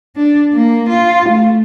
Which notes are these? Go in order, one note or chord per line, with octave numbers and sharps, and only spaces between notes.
D4
A#3
F4
A3